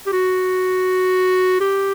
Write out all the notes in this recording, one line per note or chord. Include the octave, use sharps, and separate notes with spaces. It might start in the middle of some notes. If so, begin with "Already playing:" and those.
G4
F#4
G4